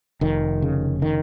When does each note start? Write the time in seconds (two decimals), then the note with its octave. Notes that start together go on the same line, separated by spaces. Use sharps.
0.21 F1 D#3
0.62 C#3
1.02 D#3